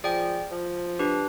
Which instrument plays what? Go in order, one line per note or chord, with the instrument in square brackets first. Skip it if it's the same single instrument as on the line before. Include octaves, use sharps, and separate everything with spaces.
[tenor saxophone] F3 [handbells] G#4 D5 G5
[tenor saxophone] F3
[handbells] D4 G4 B4